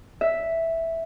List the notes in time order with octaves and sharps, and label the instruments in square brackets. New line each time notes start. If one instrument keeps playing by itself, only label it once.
[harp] E5